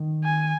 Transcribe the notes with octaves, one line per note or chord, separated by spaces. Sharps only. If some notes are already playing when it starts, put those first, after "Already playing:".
Already playing: D#3
G#5